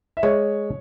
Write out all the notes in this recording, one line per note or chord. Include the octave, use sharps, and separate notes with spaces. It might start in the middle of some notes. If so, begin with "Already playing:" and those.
E5
G#3 C#5